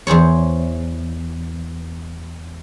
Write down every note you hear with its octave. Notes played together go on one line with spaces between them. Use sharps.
E2 G#4 C5 C#5